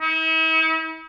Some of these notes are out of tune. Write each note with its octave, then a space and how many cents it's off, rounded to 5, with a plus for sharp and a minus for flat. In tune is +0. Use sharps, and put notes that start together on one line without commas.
E4 -45